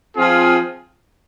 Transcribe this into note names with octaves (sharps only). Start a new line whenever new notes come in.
F3 C4 F4 G#4